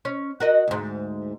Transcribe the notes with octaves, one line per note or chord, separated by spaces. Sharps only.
C#4
F#4 A#4 D#5
D2 G#2